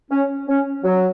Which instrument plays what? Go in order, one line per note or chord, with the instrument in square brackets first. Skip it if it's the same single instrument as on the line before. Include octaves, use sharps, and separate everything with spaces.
[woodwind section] C#4
C#4
F#3